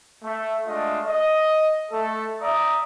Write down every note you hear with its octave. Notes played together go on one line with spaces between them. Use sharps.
A3
G#3 A3 D4 F4 D#5
D#5
A3 A4
D5 E5 A#5 D#6